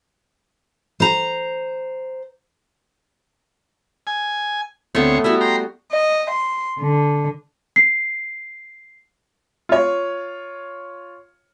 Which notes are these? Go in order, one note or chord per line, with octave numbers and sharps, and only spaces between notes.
C5 A#5
G#5
D2 A3 B3 C4 C#5
G3 B3 E4 F#4
G5 A#5 C6
D#5
C6
D3
C7
F4 C#5